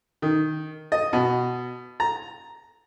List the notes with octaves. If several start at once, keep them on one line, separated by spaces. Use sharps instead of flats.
D#3
D#5
B2
A#5